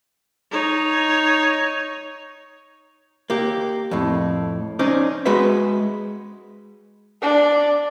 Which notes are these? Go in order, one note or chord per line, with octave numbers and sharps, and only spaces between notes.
D#4 C#5
A#3 G4
F2 A2
C#4 D#4 C5 D5
G#3 F#4 B4 E5
D4